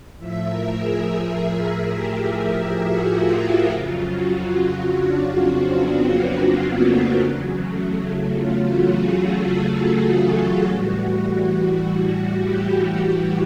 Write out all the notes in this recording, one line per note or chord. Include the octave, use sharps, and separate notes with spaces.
A2 F3 E5
A#4
G#4
G4
F#4
F4
E4
F2 C#3 F#3 F4
F#4
F4
D4
C4
B3
A#3
A#3
A3
E2 C#3 F#3
A3
F4
F#4
G#4
A4
G#4
F#4
A2 E3 G3
G4
G4